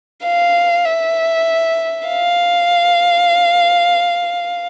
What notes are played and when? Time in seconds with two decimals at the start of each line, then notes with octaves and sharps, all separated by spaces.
0.24 F5
0.85 E5
2.08 F5